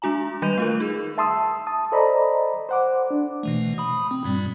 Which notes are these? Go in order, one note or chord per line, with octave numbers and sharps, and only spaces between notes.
G#3 D4 F#4 G#5 A#5
D#3 G3 B4 G6 D#7 F7
A3 F4 A#4
D#4 G#4
E5 A5 C6 D#6 E6
A5 D#6
A4 C5 D5 D#5 A#5 B5
C5 F#5 D6
D4
B2 E3 A3
B5 D#6
C4
G2 A#2 G3